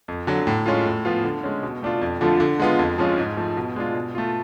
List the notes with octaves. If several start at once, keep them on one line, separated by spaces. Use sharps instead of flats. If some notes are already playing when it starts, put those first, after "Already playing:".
F2
D3 F#3
A2
G#3 C#4 F4
A2
F3 B3 F4
D3
G#3 C#4
B2
A3 D4 F4
F2
D3 F3 A3 F4
D3
G#3 B3 F4
F2
F3 G#3 C#4 F4
G#2
F3 A3
B2
G#3 D4 F4
B2
A3 F4